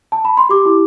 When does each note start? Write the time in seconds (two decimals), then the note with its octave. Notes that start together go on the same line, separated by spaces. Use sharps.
0.12 A5
0.25 B5
0.37 C6
0.49 G4 D6
0.66 E4